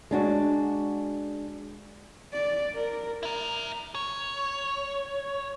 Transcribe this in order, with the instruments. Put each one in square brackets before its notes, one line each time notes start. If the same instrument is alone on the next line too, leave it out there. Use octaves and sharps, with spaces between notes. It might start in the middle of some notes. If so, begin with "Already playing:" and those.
[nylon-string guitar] G#3 D4 F#4
[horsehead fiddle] D5
A#4
[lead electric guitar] E4 A#4
C#5